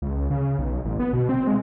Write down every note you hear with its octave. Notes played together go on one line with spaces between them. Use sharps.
C#2
C#3
B1
A1
B3
B2
C4
G#3